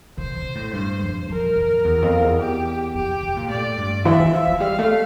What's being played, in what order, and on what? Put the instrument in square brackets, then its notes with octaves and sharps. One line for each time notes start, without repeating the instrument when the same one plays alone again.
[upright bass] C3 [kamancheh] C5
[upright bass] C3
A2
[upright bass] G2 [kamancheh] C5
[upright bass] F2
[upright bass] F2 [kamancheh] A#4
[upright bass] F2
E2
F2
E2
[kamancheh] G4
[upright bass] F2 [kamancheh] G4
[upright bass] C3
A#2
[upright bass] A2 [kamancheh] D5
[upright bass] G2
[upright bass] E3 [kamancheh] E5
[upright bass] E3
F3
F3
[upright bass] G3 [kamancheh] F5
[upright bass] A3